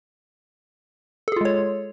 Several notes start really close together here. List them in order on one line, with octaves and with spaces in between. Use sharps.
A4 G#4 F4 G#3 C#5